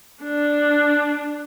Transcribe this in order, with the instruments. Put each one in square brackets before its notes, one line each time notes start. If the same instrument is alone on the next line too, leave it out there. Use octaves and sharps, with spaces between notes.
[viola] D4